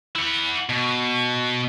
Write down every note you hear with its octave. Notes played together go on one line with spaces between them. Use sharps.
E4 F#5
B2